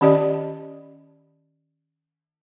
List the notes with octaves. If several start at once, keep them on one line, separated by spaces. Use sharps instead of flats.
D#3 C#4 G4 D5 D#5